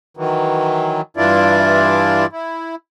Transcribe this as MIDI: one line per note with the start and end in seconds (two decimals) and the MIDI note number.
0.17 1.01 51
0.17 1.01 52
0.17 1.01 54
1.17 2.26 43
1.17 2.26 52
1.17 2.26 62
1.17 2.26 64
1.17 2.26 65
1.17 2.26 74
2.32 2.75 64